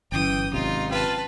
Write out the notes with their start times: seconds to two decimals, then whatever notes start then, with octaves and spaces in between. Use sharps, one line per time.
0.12 G1 E3 F#3 C#4 G5 D#6
0.53 G#1 C3 D#4 F4
0.91 F4 B4 G5 A5